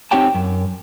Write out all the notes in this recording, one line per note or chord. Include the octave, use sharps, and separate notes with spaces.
C4 D#4 G4 C#5 G5 A5
F#2